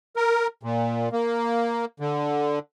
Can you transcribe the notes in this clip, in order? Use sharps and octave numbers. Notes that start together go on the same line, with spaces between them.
A#4
A#2
A#3
D3